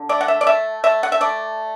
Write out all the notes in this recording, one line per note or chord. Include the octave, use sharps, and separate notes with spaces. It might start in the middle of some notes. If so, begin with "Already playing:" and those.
Already playing: D3
A3 D5
F#5
E5
D5
A3 E5
A3 E5
F#5
E5
A3 D5